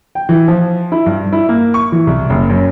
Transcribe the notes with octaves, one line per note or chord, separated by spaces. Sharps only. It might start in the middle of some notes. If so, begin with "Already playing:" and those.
G5
E3
F3
E4
G2
E4
A#3
C#6
E3
C2
F#1
F#2